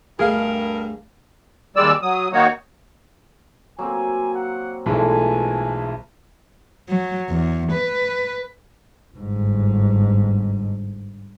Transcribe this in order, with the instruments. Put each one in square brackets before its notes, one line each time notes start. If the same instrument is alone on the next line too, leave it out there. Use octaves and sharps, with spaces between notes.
[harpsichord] D2 B2 A3 [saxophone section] G2 A#4 [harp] G#4 F5
[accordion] D#2 G3 G#3 D5 E6
F#3 D#6
D#3 A#3 D#4 F#4 C#5
[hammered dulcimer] F#3 A#3 C4 [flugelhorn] G#5
[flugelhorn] F#5
[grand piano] B1 E3 G#3 [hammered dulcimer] F3 A3 B4 [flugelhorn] G#5
[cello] F#3
E2
B4
[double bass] G1 G#2